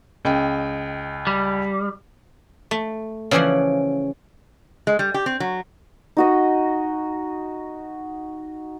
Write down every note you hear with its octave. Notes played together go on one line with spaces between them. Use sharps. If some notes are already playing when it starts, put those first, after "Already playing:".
C#2 D#5 G5
G3
A3
C#3 E3 F3 G#4 D5 F#5
G#3
G3
G4
C4
F#3
D#4 F#4 D#5